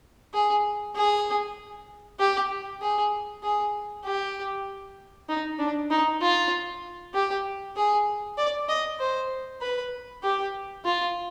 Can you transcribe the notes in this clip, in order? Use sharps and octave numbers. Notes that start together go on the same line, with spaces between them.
G#4
G#4
G4
G#4
G#4
G4
D#4
D4
D#4
F4
G4
G#4
D5
D#5
C5
B4
G4
F4